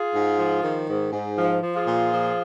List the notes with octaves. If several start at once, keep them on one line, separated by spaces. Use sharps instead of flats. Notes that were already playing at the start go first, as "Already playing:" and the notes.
Already playing: F4 G#4
G#2
F3
D#3
G#2
G#2
F3
F3
F4 G#4
A#2
F3